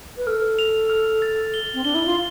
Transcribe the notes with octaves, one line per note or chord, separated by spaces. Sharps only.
B4
A4 F6
F7
F6
A6
G7
C4
D4 G7
E4
F4